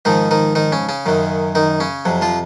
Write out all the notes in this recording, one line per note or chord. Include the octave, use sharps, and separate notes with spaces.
G#2 D#3 F3 D#4
D#3 D#4
D#3 D#4
C#3 C#4
C#3 C#4
F#2 D#3 F#3
D#3 D#4
C#3 C#4
F2 C3 F#3
F3 F4